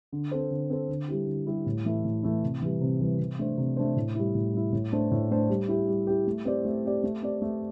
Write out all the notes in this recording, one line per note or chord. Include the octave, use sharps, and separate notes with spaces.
D3
C4 A4 C5
D3
C4 A4 C5
D3
G3 E4 G4
D3
G3 E4 G4
A2
E3 A3 E4
A2
E3 A3 E4
C3
E3 G3
C3
E3 G3
C3
A3 D4 C5
C3
A3 D4 C5
A2
G3 E4
A2
G3 E4
A2
A3 D4 C5
A2
A3 D4 C5
G3
E4 G4
G3
E4 G4
A3
C4 G4 D5
A3
C4 G4 D5
A3
C4 G4 D5
A3